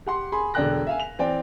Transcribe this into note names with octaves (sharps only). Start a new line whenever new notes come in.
G4 F#5 C6
G#4 B5 C6
E1 D3 D5 G5 F#6 A#6
E5 F5 G#5
F7
E3 C4 D5 G5